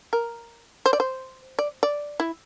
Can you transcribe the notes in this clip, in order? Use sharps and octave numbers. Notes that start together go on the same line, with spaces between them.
A#4
C5
D5
C5
D5
D5
E4